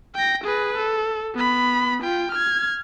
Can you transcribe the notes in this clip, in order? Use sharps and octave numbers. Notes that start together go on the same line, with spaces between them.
G5 A#6
G#4 B4
A4
B3 B5
F4 G5
F6 G#6